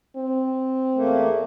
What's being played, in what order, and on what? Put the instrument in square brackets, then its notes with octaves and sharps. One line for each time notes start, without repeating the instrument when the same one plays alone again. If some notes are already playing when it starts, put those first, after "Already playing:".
[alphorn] C4
[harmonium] E2 A3 A#3